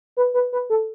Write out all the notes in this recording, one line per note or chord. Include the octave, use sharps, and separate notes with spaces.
B4
B4
B4
A4